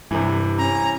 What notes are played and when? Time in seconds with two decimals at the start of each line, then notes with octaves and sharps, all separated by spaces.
0.11 G2 C3 E3
0.58 C#4 A#5